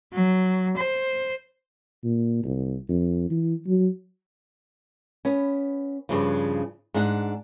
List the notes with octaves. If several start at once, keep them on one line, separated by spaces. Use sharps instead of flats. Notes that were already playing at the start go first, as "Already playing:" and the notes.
F#3
C5
A#2
C2
F2
E3
F#3
B3 C#4
G2 C#3 F3
G#2 D4 F#5